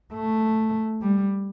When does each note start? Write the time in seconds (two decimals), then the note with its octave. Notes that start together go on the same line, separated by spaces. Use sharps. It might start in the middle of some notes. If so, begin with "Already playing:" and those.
0.13 A3
1.02 G3